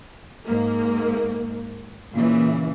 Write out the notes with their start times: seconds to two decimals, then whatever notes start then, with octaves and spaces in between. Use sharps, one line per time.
0.46 G#2 A#3
2.12 A#2 C#3 E3